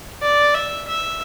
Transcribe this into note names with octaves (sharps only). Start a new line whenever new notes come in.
D5
E5
E5